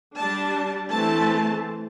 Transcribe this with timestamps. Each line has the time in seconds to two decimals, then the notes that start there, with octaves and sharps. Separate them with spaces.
0.17 G3 D4 A5
0.92 E3 A3 C4 A5